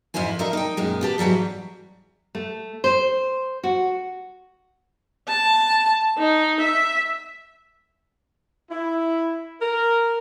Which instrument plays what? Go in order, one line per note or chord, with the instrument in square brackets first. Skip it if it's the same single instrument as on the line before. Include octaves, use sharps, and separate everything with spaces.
[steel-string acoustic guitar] F2 G#2 E4 C5 G#5
G3 D#4 F4 A4 A#4 E5
D#4 G5
F#2 A#2 G#3
B3 G4 A5
G#2 E3 F#3 G3 G#4
[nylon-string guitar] A3
C5
F#4
[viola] A5
D#4
E5
[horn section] E4
A#4